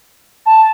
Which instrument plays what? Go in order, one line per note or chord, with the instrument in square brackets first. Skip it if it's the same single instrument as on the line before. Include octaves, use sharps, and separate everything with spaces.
[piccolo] A5